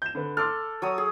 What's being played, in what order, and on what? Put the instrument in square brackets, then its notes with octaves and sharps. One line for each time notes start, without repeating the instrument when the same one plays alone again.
[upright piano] G6 E7
D3 B4
[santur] A4 [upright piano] C6 D6 F6
[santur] F#3 C#5 D#6
G#4